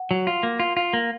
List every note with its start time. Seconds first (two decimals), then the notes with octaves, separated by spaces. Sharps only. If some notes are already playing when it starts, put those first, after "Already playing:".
Already playing: F#5
0.11 F#3
0.27 F4
0.43 A#3
0.60 F4
0.77 F4
0.93 A#3